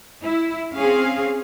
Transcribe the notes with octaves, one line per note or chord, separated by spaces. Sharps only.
E4
C4 C#4 G#4 F5